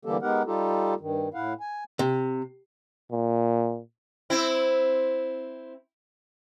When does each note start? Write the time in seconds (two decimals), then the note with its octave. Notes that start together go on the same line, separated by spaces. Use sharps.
0.05 D3 E3 G3 A#3 G4 A4
0.22 G#3 B3 D#4 G4 A#4 F#5
0.46 G3 D#4 F4 G4 A4
1.00 G2 D#3
1.34 A2 E4 F5 F#5
1.60 G#5
1.99 C3
3.12 A#2
4.30 C4 E4